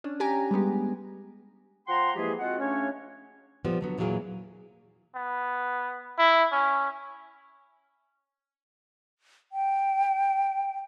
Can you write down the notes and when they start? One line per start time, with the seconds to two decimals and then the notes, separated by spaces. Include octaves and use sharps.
0.04 C#4 D4
0.20 C#4 G4 G#5 A#5
0.51 G3 G#3 B3 G4
1.87 F3 F#5 G5 A#5 C6
2.16 E3 F3 G#3 A#3 G4 G#4
2.39 G#3 C4 F4 F#4 F#5
2.59 C#3 A3 C#4 D4 C#5
3.65 A#2 F3 G3 B3
3.81 D3 F#3 B3
3.98 E2 A#2 E3 F#3 A#3 G#4
5.15 B3
6.18 E4
6.52 C#4
9.52 G5